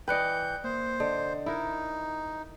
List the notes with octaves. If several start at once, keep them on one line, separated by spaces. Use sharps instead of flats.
E3 B4 D5 D#5 G5 F#6 G6 C#7
A#3 C5
D3 D#5
D#4 E4 A#4